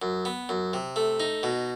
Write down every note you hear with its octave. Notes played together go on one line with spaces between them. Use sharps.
F#2
B3
F#2
C3
A3
D#4
B2